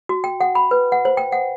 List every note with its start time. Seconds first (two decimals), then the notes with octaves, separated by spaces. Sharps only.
0.09 F#4
0.24 G5
0.41 F#5
0.55 B5
0.71 B4
0.92 F#5
1.05 C5
1.17 G5
1.32 F#5